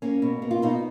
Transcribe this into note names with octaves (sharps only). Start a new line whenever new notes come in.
A#3 C#4
B2
A#3
F4
B2 D#4